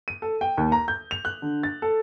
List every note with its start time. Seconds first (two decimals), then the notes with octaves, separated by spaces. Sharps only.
0.08 D#7
0.22 A4
0.41 G5
0.58 D#2
0.72 A#5
0.88 G6
1.11 F7
1.25 F#6
1.42 D3
1.63 A6
1.82 A4